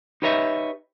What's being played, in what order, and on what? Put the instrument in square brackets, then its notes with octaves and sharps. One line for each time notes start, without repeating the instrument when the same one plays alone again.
[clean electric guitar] D#4 G4 B4 C#5 D#5 E5